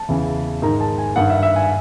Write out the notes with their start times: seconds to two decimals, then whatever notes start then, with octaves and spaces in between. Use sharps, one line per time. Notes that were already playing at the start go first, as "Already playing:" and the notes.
Already playing: A5
0.09 E2 C#3 E3
0.62 G#2 D#3 A#5
0.81 A5
0.98 G#5
1.16 G2 D#3 F#5
1.30 E5
1.43 E5
1.56 G#5